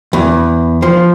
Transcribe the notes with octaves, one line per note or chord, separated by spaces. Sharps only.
E2
F3